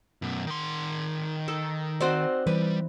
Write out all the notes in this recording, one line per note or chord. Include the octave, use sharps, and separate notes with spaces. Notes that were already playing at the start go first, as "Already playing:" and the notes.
F#2 B2
D#3 C6
D#4 A4
C4 F#4 C5 D5 D#5
E3 G3 B4